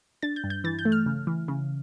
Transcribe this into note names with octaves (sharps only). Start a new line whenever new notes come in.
D4 A6
G6
G2
G6
E3 A6
G6
A3
F6
C#3
E3
C#3